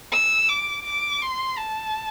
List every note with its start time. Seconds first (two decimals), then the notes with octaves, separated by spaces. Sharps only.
0.12 E6
0.49 D6
0.85 D6
1.22 C6
1.58 A5